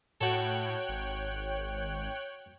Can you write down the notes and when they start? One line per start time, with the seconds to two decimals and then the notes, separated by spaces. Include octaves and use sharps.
0.21 A2 F#4 A4 C#5 G5 F#6
0.89 G#1